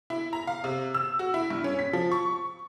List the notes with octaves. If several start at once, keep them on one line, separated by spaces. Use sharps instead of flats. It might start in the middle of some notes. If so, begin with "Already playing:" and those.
E4
A#5
F5
C3
E6
F#4
E4
G2
C#4
B6
F3
C#6